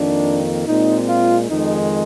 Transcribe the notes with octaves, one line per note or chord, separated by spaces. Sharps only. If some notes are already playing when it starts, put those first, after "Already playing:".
Already playing: F2 D#3 A#3 D4
A#2 G#3 C4 D#4
F4
F2 D#3 G#3 D#4